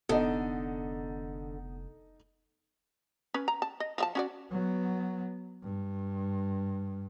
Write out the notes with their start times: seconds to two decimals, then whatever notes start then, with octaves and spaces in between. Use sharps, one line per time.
0.09 F1 D3 B3 D#4 A4
3.34 C#4 B4
3.48 A#5
3.62 A5
3.80 D#5
3.98 F3 E5 A5
4.15 C#4 F#4 D5
4.51 F#3 B3
5.63 G2